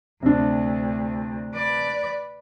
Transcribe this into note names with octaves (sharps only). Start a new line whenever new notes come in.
D2 C3 D4
B4 D5